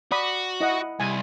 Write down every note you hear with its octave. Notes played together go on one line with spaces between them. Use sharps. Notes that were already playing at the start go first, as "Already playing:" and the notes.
F#4 D5 B5 D#6
E4 D#5 F#5
C2 G#5